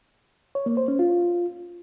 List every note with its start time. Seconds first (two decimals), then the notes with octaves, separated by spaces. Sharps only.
0.55 C#5
0.66 A#3
0.77 C5
0.88 C#4
0.99 F4